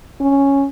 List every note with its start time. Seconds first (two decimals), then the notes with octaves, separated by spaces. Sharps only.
0.20 C#4